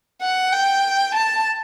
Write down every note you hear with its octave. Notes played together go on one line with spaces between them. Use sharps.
F#5
G5
A5